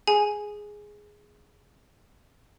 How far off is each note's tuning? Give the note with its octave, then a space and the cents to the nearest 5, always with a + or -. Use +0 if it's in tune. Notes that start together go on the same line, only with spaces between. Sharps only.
G#4 +0 G#5 +5